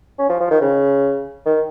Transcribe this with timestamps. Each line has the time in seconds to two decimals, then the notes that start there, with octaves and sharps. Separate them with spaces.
0.19 C#4
0.29 F3
0.40 F3
0.51 D#3
0.61 C#3
1.46 D#3